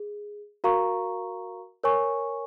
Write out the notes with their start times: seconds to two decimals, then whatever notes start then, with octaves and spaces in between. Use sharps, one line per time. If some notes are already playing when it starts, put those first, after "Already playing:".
Already playing: G#4
0.64 F#4 A#4 F5 A#5 C#6
1.83 A#4 C#5 G#5 C#6